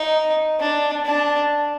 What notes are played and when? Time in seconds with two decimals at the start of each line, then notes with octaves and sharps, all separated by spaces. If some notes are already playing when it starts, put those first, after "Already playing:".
Already playing: D#4
0.60 D4
1.05 D4